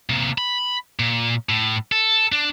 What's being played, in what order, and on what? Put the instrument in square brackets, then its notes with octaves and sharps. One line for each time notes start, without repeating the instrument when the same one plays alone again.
[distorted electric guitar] C3 A#3
B5
A#2
A2
A4
D4